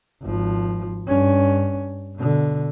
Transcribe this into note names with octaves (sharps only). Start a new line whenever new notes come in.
G#1 F3
G2 C#4
B2 D3